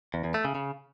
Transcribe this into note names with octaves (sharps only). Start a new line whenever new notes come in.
E2
E2
A3
C#3
C#3